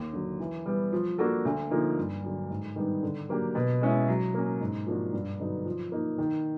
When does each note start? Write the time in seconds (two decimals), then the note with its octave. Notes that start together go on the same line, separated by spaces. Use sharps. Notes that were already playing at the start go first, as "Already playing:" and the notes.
Already playing: D#2
0.13 D3 F#3
0.40 E3
0.66 G3 B3
0.92 F3
1.18 A#3 D4 F#4 A4
1.45 D2
1.71 D3 F3 A#3 D#4
1.97 G2
2.23 D3 F#3
2.50 G#2
2.76 D#3 G3 B3 D4
3.03 D3
3.29 F#3 A#3 D4 G4
3.55 B2
3.81 G#3 C#4 E4
4.08 F#3
4.34 A#3 C#4
4.61 G#2
4.87 F3 A#3 D4 F#4
5.13 G2
5.40 D3 F#3 B3 D#4
5.66 F3
5.92 A#3 D#4
6.18 D#3